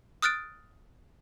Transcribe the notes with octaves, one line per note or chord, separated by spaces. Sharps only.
D#6 F6 F#6 A6 D7